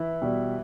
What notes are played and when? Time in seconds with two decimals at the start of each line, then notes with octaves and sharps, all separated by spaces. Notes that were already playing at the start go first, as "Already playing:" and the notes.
Already playing: E3 E4
0.22 B2 G3